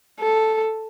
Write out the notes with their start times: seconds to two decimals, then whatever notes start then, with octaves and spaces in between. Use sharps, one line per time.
0.20 A4